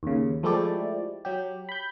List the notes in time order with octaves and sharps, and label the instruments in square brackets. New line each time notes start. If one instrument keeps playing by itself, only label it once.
[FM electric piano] D#2 C#3
F3 G#3 A3 E4 G4 D5
F#3 G4
B5 G6